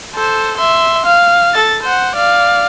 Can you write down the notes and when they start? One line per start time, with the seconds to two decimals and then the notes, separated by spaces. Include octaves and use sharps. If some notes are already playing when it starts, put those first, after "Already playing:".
0.15 A4 C5
0.58 E5 C6
1.05 F5
1.54 A4 A6
1.83 C5 F#5
2.15 D5 F5